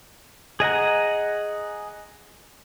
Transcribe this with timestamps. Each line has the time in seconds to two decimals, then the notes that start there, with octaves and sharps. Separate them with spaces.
0.60 G#4 D#5 F#5 A#5